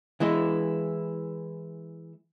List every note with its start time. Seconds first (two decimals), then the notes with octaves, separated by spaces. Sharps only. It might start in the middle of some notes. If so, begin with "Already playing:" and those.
0.20 E3 G#3 E4